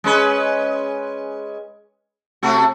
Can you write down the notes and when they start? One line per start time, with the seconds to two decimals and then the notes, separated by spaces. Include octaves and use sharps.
0.04 G#3 C#4 B4
2.43 C3 A3 F#4